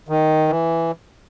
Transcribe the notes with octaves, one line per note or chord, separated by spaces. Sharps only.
D#3
E3